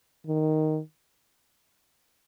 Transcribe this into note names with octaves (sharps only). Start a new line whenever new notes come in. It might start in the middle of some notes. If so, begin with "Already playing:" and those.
D#3